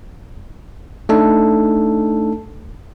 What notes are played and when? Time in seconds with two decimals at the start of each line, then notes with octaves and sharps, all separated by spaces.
1.09 A3 D4 D#4 A4